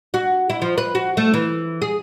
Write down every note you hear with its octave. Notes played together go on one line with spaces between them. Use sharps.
F#4
E4
F3
B4
F#4
A3
E3
G#4